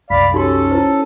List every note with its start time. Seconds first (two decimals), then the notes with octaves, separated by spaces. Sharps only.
0.10 C2 F#2 D5 F5 B5
0.34 C#4 D#4 F#4 G4 A4 C6
0.72 E4 C5 A5